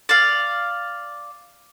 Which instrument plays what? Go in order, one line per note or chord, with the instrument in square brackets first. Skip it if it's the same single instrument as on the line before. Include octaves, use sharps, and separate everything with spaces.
[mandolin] D5 F5